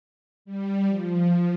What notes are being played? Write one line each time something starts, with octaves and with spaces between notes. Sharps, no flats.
G3
F3